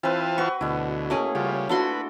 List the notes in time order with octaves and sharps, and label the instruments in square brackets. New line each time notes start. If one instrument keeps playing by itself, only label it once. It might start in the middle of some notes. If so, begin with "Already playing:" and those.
[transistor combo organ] E3 F4 A5 [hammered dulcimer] C4 B4
[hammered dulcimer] F#4 B4 [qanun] C#6
[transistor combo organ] D2 [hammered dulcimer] B2 E4
[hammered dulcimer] A3 [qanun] A#3 C#4 G#4
[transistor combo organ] C#3 G3 [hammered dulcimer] F4
[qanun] D4 F#4 C6 [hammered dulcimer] E4 A4 [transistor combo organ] B4